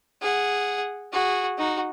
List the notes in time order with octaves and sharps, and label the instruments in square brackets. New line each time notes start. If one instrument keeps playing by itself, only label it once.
[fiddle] G#4 F#5
F#4 G#4
D#4 F#4